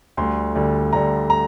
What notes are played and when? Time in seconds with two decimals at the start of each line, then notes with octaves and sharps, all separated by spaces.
0.17 D2 D3 G3 C6
0.55 D2 D3 G3
0.93 D2 D3 G3 A#5
1.30 A#5